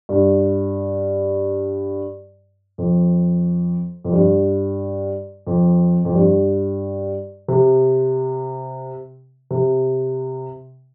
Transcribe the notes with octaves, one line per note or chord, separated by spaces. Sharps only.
G2
F2
F2
G2
F2
F2
G2
C3
C3